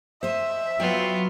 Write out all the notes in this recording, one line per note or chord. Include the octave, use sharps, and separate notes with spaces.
C5 D#5 E5
F#3 B3 F4 G5